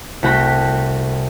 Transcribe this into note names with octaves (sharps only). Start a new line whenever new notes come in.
C2 A3 F#4 F#5 G5 B5